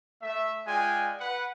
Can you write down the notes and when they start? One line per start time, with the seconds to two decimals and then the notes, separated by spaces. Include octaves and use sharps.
0.22 A3 E5
0.66 G#3 F4 D5 G5 G#5
1.20 B4 F#5